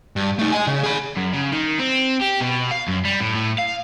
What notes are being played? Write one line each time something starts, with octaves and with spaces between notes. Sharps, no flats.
G2
A3 D#4
D#5 G#5
C#3
G#4 B5
F#2
C#3
D#3
C4
G4
B2
F5
F#2
G3
A2
A2
F5